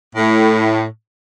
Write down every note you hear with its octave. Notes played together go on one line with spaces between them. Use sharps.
A2